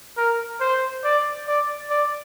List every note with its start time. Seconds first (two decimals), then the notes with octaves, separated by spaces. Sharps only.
0.17 A#4
0.60 C5
1.04 D5
1.47 D5
1.90 D5